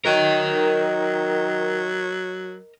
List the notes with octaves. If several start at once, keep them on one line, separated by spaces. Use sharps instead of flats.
D#3 F#3 A#4 D#5